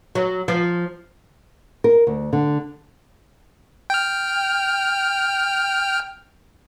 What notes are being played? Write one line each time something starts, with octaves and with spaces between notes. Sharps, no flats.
F#3
F3
A#4
D2
D3
G5 F6